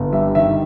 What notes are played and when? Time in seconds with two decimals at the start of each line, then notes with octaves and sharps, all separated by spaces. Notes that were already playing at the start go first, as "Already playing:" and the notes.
Already playing: G1
0.12 G3 E5
0.35 D#3 E5